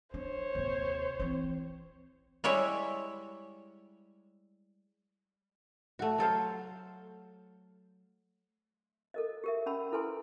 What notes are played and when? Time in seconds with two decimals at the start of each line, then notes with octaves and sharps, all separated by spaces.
0.14 D4 C5 C#5
0.55 D#2 C3
1.19 E3 C4
2.44 G3 G#3 E4 C#5
5.99 A3 F#4
6.18 F#3 A4 C5 F5
9.14 A4 A#4 D#5
9.44 G4 A#4 E5
9.66 C#4 F#5 A5 B5 E6
9.92 E4 A4 B4 G#5 C6